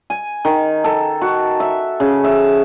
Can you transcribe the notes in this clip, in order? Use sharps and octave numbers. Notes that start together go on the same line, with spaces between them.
G#5
D#3
A4
F#4
E5
C#3
E5